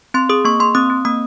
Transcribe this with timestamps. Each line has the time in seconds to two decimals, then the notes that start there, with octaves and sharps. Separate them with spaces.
0.14 C4 C6
0.29 G#4 D#6
0.45 A#3 C#6
0.60 A#3 C6
0.75 C4 D#6
0.90 C4
1.05 A#3 D#6